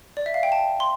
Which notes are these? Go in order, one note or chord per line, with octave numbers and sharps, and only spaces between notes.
D5
E5
F5
G5
A5
C6